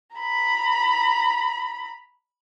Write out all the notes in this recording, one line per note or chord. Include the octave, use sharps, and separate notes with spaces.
A#5 B5